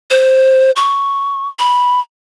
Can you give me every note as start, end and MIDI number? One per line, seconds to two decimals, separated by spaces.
0.11 0.71 72
0.76 1.48 85
1.59 2.00 83